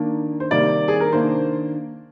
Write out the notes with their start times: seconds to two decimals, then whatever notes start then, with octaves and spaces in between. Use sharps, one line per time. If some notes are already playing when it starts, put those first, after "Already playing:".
Already playing: D#3 A#3 D4
0.40 C5
0.51 C3 D#3 G3 A#3 D5
0.88 G#4
1.00 A#4
1.12 D#3 A#3 D4 C5